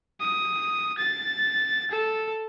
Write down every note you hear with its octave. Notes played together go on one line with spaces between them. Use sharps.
D#6
A6
A4